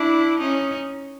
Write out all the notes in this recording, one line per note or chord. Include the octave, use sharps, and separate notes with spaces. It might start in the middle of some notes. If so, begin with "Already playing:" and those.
Already playing: D4 E4
C#4 D#4